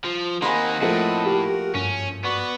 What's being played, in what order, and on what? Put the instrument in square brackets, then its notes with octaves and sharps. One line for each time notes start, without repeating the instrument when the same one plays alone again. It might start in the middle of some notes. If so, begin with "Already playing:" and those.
[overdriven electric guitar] F3
[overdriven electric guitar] D#3 A#3 [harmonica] C4 D#5 F#5 [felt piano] G#5 B5 C6
[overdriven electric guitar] A2 [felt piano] F3 A3 A#3
[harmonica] F#4 A#4 [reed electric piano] G4
[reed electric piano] G2 [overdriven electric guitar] C#4
[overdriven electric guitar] B3 [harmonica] F#4 D5 C#6